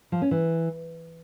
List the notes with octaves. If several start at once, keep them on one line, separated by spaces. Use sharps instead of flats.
F3
C#4
E3